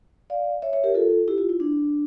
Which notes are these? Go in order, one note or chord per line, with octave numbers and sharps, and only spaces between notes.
D5 F5
C#5 E5
C#5 E5
G4 A#4
F4 A4
E4 G4
F4
E4
D4